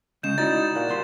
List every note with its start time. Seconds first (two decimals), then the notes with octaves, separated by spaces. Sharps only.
0.23 C#3 G#3 C#4 G6 E7
0.38 D#4 E4 F#4 D5 A6
0.75 A#2 F#4
0.88 C2 G3 C6